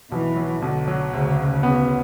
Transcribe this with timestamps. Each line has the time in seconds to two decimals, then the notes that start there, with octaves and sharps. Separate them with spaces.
0.12 B1 E3
0.36 F#3
0.62 B1 D3
0.87 F#3
1.13 D2 C#3
1.38 D2
1.63 B3